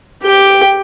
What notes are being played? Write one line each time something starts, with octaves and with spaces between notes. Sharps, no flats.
G4 G5